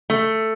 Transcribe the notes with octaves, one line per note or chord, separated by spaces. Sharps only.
A3